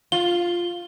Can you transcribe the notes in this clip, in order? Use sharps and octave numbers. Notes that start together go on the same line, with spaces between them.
F4 G7